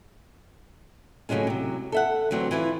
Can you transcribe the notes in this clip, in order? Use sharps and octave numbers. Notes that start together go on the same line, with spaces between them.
A2 C#3 E3 F#3 G#3 C#4
C3 F#3
A4 E5 F#5
D2 E3 F#3 C4
E3 E4 F4